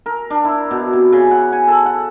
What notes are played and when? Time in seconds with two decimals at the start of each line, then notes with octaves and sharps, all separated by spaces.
0.06 A#4
0.30 D4
0.44 E4
0.70 B2
0.93 C3
1.12 C#3
1.31 F#5
1.52 G#5
1.68 A4
1.86 F#5